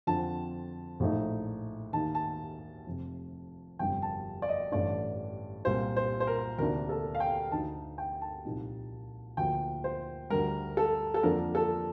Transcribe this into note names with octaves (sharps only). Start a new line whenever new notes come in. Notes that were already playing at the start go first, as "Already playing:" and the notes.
F2 D3 F3 C4 A5
A#1 A2 A3 D#4
D#2 D#3 A#3 D#4 A5
A5
F1 F2 C3
G1 F2 C3 G3 D4 G5
A5
D5
D#5
A1 G2 D3 A3 D4 D5
C2 A#2 G3 C5
C5
C5
A#4
D2 C3 D#3 A#3 D4 A#4
A4
F5
G5
D2 D3 A3 D#4 A5
G5
A5
C2 A#2 F3 A#3 D#4
D2 D3 F3 A#3 G5
C5
D2 D3 G3 A#4
A4
A4
F2 D3 F3 A#3 D4 A#4
A4